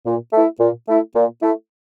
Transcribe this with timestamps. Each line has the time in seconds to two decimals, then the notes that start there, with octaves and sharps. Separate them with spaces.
0.05 A#2
0.33 A3 E4
0.60 A#2
0.88 A3 E4
1.15 A#2
1.42 A3 E4